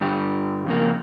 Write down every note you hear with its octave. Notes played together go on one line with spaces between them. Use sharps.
G2 D3 G4
F2 C#3 A#3